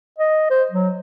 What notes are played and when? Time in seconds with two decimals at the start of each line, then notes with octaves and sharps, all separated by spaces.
0.18 D#5
0.50 C5
0.71 F#3